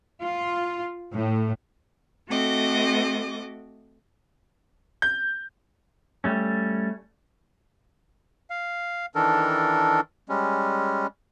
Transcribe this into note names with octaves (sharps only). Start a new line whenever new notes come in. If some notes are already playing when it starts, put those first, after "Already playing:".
F4
A2
A3 C4 F#4 A4 D#5 D6
G6
G3 A3 C#4
F5
D#3 E3 D4 A4 A#4
G3 G#3 C#4